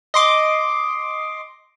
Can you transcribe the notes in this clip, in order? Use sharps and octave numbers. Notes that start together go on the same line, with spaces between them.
D#5 C6 D6